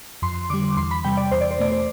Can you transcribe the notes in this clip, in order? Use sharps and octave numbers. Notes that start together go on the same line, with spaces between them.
F2 C6
D3 G3 D6
E2 C6
B5
C3 G3 G5
D5
E2 C5
D5
C5
B2 A3 D5
C5